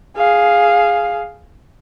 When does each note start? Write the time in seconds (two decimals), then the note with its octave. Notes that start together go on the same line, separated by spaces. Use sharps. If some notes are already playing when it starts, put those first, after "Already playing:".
0.17 G#4 F5